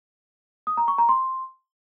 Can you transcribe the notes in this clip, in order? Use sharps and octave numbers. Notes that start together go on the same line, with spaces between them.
D#6
A#5
C#6
A#5
C6